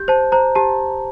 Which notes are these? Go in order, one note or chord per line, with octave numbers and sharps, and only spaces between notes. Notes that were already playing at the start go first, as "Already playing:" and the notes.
Already playing: G4 G6
C5 A5
C5 A#5
G4 A5